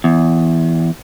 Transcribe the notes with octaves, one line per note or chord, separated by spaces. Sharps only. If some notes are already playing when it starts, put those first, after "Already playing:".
E2